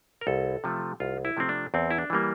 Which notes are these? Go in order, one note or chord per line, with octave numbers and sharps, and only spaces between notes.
A#4
C2 A4
C3 F3 A3
C2 F4
E4
C3 F3 A3 C4
D4
E2 C4
E4
D4
E3 G3 A#3